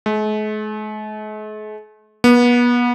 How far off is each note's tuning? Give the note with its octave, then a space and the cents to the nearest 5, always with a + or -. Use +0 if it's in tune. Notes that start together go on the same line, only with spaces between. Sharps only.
G#3 +45
B3 -30